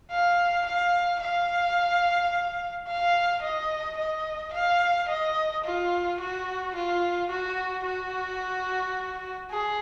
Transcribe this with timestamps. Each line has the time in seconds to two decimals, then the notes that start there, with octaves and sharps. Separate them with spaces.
0.11 F5
0.66 F5
1.21 F5
2.88 F5
3.42 D#5
3.97 D#5
4.53 F5
5.08 D#5
5.64 F4
6.20 F#4
6.75 F4
7.30 F#4
7.85 F#4
9.51 G#4